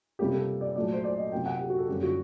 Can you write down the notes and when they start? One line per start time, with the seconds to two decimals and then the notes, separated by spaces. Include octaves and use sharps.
0.19 C3 G3 A#3 G4
0.33 A4
0.61 D5
0.76 A#2 F#3 A3 D5
0.93 C5
1.04 D5
1.17 D#5
1.32 C3 F#3 A#3 G5
1.46 F#5
1.61 G4
1.70 F#4
1.78 A4
1.88 F#2 D3 G3 A#3 G4
2.03 F#4